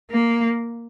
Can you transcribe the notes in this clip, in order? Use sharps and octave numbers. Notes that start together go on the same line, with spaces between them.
A#3